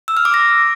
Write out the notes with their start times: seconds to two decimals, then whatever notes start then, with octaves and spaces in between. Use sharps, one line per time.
0.08 E6
0.17 F6
0.25 D6
0.34 A#6